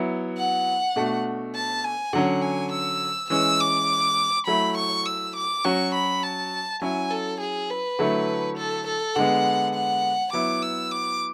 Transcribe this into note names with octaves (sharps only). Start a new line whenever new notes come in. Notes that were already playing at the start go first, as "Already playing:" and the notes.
Already playing: F#3 B3 E4
F#5
B2 A3 D4 F#4
A5
G#5
D3 F#3 C#4 F#5
G#5
E6
E3 G#3 C#4 E6
D6
F#3 A3 E4 B5
C#6
E6
D6
F#3 C#4 F#4 C#6
B5
A5
F#3 C#4 E4 G#5
A4
G#4
B4
D3 F#3 A3 E4
A4
A4
D3 G#3 B3 F#5
F#5
F#3 B3 E4 D6
E6
D6